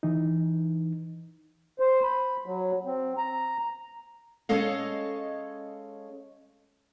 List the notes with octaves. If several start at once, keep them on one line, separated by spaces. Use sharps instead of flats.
E3 D#4
C5
B5
F#3
C4
A#5
G#3 C#4 A4 D#5 F5